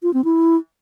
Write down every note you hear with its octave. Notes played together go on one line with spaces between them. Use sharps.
F4
C4
E4